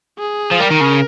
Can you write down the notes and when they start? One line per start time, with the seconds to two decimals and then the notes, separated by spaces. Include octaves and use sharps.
0.18 G#4
0.51 F3
0.60 G3 A#4
0.70 D#3
0.80 C#3